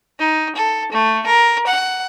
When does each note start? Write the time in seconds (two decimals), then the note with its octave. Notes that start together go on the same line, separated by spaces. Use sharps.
0.19 D#4
0.56 A4
0.92 A3
1.26 A#4
1.66 F#5